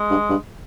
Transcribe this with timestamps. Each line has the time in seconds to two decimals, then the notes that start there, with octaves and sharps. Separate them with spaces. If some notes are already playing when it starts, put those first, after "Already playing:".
Already playing: G#3
0.10 G2
0.30 G2